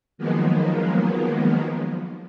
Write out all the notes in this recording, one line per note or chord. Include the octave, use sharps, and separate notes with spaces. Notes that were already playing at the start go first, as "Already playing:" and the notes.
D#3 F3 F#3 G#3 A#3 B3